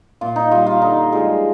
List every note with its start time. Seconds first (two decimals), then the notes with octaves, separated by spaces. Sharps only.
0.21 A#2 F4
0.36 D#4
0.51 G3 F4
0.66 F4
0.82 D3 D#4
1.12 F3 G#3